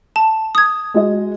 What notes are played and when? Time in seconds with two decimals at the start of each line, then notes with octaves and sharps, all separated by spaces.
0.16 A5
0.55 D#6 G#6
0.94 G#3 F#4 D#5